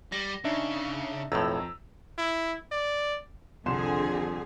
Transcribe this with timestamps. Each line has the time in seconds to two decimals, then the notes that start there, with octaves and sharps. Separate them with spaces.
0.12 G3 A#6
0.44 C#3 D4 D#4 E5
1.32 B1 F2 A2 A#5 E6
2.18 E4
2.72 D5
3.66 C2 F2 D3 G#4 C6 E7